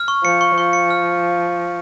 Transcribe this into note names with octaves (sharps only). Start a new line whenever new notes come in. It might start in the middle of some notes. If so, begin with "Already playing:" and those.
Already playing: F6
C#6
F3 C#7
C#6
F3 C#6
C#7
F6